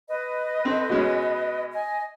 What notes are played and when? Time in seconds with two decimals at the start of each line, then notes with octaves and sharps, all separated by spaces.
0.09 B4 D#5
0.65 C4 A4
0.89 B2 G#3 C#4
1.72 D#5 G#5